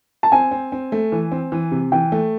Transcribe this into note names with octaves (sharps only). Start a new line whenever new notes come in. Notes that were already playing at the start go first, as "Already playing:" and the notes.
A5
C4 G#5
C4
C4
A3
E3
C4
E3
C3
E3 G5
A3